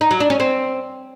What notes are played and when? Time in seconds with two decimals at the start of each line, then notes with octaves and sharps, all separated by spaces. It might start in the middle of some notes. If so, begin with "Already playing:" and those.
0.01 D#4
0.11 F#3
0.20 D4
0.30 C#4
0.40 C4